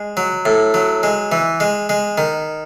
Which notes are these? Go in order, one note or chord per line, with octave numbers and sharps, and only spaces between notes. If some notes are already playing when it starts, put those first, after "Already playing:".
Already playing: G#3
F#3
A2
F#3
G#3
E3
G#3
G#3
D#3